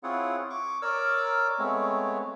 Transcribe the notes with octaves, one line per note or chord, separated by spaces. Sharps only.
C4 E4 F4 G#4 C#5 F#5
C#6 D6
A#4 C#5 D5 D6 E6
G#3 A3 B3 C4 C#5